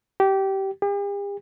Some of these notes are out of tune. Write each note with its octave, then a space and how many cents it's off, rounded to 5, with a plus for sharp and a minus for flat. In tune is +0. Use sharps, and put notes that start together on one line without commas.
G4 -20
G4 +45